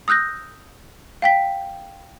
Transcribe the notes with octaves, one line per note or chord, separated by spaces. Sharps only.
D#6 E6 F#6 G6 A#6
F5 G5 B6